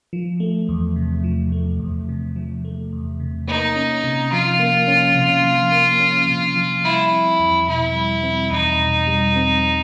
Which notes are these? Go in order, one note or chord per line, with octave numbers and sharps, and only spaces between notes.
F3
A3
E2
C3
F3
A3
E2
C3
F3
A3
E2
C3
A#3 D#4
C#4
C3
F3 F4
A#3
C#4
C3
F3
A#3
C#4
C3
F3
G3 E4
C4
E2
B2 E4
G3
C4
E2 D#4
B2
G3
C4